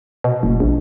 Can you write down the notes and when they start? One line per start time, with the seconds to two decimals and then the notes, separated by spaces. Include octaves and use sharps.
0.24 B2
0.43 F#1
0.60 A#1